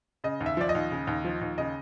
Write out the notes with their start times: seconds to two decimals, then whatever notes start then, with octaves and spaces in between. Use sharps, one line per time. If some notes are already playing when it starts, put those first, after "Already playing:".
0.24 C#3 D#5
0.40 D#2
0.46 E5
0.57 F3 D5
0.69 D#5
0.75 D#2
0.91 C#3
1.07 D#2
1.25 F3
1.41 D#2
1.58 C#3 D#5